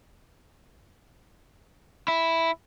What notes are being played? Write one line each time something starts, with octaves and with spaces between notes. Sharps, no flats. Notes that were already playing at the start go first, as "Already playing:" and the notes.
E4